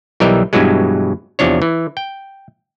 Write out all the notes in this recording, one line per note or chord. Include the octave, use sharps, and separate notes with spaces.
B1 E3 G3 A#4 D#5 E5
G2 B2 E3 F#3 G#3
E2 C3 F3 D4 C#5
E3
G5